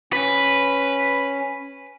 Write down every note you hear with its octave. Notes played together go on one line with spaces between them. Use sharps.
C#4 B4